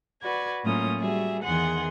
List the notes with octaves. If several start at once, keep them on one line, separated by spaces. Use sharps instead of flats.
F#4 B4 D5 G#6
A2 F#3 A#3 C#4 F4 D#6
G3 F#4 G#4 E5
E2 D#3 E3 G#4 F#5 C6